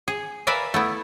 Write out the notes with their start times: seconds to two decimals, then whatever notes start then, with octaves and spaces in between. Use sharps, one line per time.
0.08 G#4
0.47 A#4 B4 D5 E5 F5 G#5
0.74 A3 B3 E4